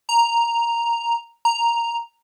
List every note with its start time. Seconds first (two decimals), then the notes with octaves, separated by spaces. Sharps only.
0.09 A#5
1.45 A#5